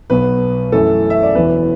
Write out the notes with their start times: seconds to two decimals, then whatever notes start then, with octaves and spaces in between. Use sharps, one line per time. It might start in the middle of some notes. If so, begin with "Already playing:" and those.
0.10 B1 B2 B3 B4
0.72 F#2 E3 A3 A4
1.10 E5
1.23 D5
1.35 E1 E2 E3 B3 B4